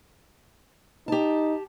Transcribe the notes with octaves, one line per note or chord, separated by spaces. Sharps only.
D#4 G4 A5